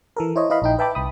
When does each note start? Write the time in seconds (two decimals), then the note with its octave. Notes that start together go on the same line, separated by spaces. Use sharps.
0.16 E3 A4 A#4
0.36 E4 C5 C#5 D#5
0.50 E4 B4 D#5 F5 B5
0.62 A#1 D#4 G5
0.79 B4 E5 G5 A5 B5 D6
0.95 C2 B5 D#6